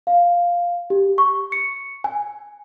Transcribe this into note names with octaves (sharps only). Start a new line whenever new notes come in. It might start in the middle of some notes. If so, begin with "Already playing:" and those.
F5
G4
C#6
C#7
G#5